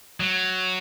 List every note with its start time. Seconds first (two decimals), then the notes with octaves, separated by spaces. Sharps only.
0.20 F#3